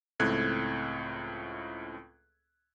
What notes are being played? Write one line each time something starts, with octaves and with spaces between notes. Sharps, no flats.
C#2 A2 C4 A4 F#6 G#6